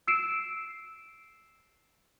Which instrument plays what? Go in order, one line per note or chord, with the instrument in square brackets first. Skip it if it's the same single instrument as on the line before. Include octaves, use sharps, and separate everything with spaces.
[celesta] E6 C7 D7 E7